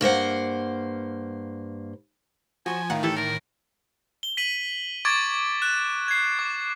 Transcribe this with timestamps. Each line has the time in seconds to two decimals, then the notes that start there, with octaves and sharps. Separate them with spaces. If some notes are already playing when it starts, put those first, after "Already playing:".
0.01 G2 A#3 C5 F#5
2.66 F3 F#4 C5 C#5 G#5
2.90 A2 D#3 D#4 F4 F#5 G5
3.03 E3 E4 G4 A4
3.16 A#4 D5 A5
4.23 G7
4.37 B6 D#7 F#7
5.05 C#6 D6 G#6 A6 D7
5.62 F#6 E7
6.08 G#6 C7
6.39 D6